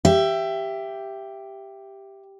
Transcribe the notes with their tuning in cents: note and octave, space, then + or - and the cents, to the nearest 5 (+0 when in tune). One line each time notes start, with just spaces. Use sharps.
G4 +0 E5 +15